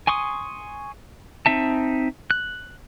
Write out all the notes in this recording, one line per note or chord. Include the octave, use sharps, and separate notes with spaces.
G#5 C6 C#6 D#6
C4 D#4 E5 A5
F#6